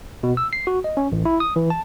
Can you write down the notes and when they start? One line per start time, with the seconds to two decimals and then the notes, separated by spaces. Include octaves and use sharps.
0.23 B2
0.37 E6
0.53 C7
0.67 F#4
0.84 D#5
0.97 C#4
1.12 A1
1.25 E4
1.40 D#6
1.56 E3
1.70 A5